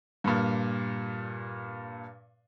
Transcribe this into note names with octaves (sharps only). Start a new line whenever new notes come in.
G2 A#2